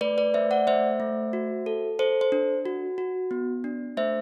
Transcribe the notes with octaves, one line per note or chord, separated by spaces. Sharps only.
A3 B4 D5
B4 D5
A3 C5 E5
D5 F#5
A3 C5 E5
A3
F#4
A4
A4 C5
C5
D4
F#4
F#4
B3
D4
A3 C5 E5